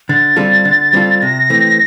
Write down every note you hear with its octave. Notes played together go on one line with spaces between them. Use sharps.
D3 A6
G3 C4 F4 A4
D3
G3 C4 F4 A4
C3 A#6
E3 A3 C4